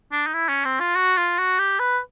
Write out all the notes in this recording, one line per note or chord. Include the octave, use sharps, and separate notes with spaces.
D4
D#4
E4
C#4
C4
F4
F#4
F4
F#4
G4
B4